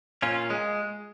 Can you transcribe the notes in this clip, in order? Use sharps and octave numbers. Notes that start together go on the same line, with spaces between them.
A#2 C#4 F4
G#3